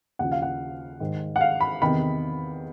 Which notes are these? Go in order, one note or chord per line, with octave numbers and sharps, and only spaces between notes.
D#2 C#3 F3 F#5
F5
F#5
G#2 D#3
F#5
F5
B5
E2 C3 D#3 B5